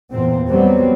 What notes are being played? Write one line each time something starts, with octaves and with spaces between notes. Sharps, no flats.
E2 A#2 C4
F#3 G3 B3 C4